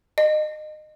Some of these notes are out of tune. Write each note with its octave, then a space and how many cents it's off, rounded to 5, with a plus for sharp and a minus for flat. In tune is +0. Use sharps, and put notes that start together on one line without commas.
D#5 -25